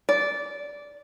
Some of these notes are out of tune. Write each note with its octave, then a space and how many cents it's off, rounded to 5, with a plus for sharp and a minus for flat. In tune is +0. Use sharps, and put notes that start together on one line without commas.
D5 -15